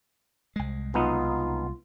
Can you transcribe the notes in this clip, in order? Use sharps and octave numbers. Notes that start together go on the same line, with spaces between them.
C2 G#3
B1 B3 D#4 F4